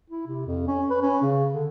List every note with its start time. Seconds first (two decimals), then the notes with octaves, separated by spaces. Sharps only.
0.10 E4
0.27 C3
0.47 F2
0.67 C#4
0.90 B4
1.02 C#4
1.22 C#3
1.54 D3